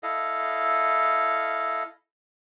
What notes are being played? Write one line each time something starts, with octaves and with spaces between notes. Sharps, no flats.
E4 A4 D#5 F5